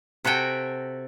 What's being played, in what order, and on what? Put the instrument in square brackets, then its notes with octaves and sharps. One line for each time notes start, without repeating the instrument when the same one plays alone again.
[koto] C3 F#4 A4 G5 G#5